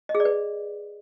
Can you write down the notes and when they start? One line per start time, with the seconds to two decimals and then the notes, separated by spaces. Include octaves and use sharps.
0.09 D#5
0.15 G#4
0.20 D5
0.25 B4